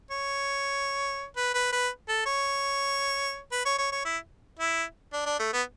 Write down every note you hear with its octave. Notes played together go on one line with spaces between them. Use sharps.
C#5
B4
B4
B4
A4
C#5
B4
C#5
C#5
C#5
E4
E4
D4
D4
A3
B3